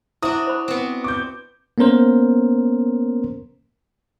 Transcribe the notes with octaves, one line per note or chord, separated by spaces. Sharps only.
D4 E4 F#4 C5 E5 D#6
C5 B5
B3 C4
D6 G6
A#3 B3 C#4 A#4 C5